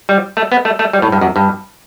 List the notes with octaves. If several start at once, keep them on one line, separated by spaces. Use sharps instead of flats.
G3
A3
B3
A3
A3
G3
A2
G2
F#2
G2